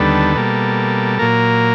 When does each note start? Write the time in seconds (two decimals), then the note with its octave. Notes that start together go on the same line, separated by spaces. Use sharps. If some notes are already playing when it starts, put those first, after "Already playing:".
Already playing: D#2 D3 G3 B3 A4
0.36 B2 G3 A#3
1.19 A#2 F#3 A#3 A#4